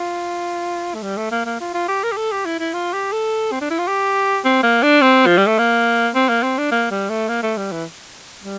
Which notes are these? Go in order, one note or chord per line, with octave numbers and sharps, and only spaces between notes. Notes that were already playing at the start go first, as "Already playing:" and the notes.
Already playing: F4
A3
G3
A3
A#3
A#3
F4
F4
G4
A#4
G4
A4
G4
E4
E4
F4
G4
A4
C4
D4
E4
F4
G4
C4
A#3
D4
C4
F3
G3
A3
A#3
C4
A#3
C4
D4
A#3
G3
A3
A#3
A3
G3
E3
G3